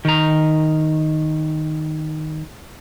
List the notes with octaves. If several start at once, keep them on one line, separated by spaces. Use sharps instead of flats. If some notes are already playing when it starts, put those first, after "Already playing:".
D#3 A#5